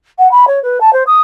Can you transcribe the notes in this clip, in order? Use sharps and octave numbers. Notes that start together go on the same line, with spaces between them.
F#5
B5
C#5
B4
A5
C5
D#6